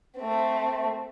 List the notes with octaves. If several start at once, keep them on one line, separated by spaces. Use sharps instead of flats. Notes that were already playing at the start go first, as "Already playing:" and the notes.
A3 C4